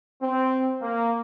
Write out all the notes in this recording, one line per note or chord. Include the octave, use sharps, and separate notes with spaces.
C4
A#3